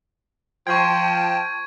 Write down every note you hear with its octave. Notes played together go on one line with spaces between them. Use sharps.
F3 G5 A5 C#6 G#6